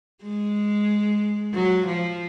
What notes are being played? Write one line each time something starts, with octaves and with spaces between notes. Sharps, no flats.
G#3
F#3
F3